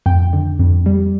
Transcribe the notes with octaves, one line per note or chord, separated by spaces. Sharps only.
F2 G5
D3
F2
G3